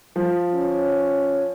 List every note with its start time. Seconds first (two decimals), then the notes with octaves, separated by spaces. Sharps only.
0.16 F3
0.54 C#4